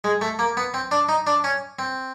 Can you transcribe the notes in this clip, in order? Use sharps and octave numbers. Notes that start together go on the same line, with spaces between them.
G#3
A3
A#3
B3
C4
D4
D#4
D4
C#4
C4